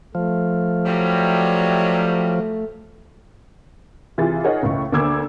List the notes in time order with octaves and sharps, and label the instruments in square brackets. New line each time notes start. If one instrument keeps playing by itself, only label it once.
[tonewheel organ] F3 [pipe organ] A3
[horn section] C3 F#3 G3
[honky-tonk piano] C3 E3 F4 G#4 A6
D#4 G#4 A#4 C#5 D#5 F#5
C#2 A2 C#6
D2 D3 A#3 D6 E6 G#6